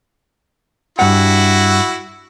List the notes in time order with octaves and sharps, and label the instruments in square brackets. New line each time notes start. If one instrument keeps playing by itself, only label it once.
[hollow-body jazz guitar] G2 F#5 [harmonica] E4 F#4